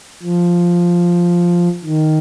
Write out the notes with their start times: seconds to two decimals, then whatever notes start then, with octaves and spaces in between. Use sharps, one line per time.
0.23 F3
1.85 D#3